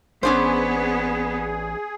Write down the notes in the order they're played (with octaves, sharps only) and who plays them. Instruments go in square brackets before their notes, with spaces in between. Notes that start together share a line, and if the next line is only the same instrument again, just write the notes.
[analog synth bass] A1 [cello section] B3 [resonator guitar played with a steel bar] C#4 D4 C5 [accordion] G#4